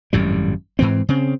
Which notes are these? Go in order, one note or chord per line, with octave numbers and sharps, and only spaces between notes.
G#1 F#2 A2 G3
G#2 E3 C4
C#3 C4